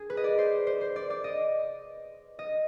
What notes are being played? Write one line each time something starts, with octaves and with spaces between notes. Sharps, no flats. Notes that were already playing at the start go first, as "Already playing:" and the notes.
Already playing: G#4
B4
D#5
D5
C5
C5
C5
D5
D5
D#5
D#5